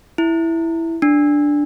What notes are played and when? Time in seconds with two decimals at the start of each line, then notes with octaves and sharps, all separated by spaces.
0.18 E4
1.02 D4